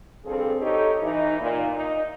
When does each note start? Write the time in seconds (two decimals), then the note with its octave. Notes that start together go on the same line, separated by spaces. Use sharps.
0.25 G2 F3 C4 G#4 A4
0.60 D#4 G4 A4 C#5 D#5
1.01 E3 D#4
1.40 A#2
1.76 D#4